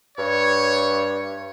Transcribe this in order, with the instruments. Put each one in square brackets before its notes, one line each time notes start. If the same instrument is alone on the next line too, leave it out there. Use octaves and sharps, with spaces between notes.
[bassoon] G2 [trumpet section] C#5